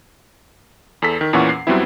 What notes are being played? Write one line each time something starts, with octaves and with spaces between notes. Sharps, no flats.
E2 A4 B6
D#3
E2 A#2 E3 C#4 F#5 C#6
C7
F#2 F#3 G3 B3 C4 E4